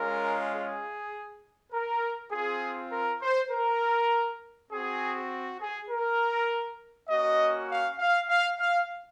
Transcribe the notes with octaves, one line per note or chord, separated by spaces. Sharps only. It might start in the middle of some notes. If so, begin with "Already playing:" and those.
Already playing: G#3 C#4 F4 A#4
G#4
A#4
C4 F4 G#4
A#4
C5
A#4
C4 F#4 G#4
G#4
A#4
A#3 C#4 F#4 D#5
F5
F5
F5
F5